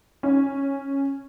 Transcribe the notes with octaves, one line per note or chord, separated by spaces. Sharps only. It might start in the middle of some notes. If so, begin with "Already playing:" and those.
C#4